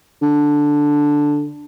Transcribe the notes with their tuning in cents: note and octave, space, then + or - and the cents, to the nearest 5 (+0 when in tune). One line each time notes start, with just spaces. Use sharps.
D3 +0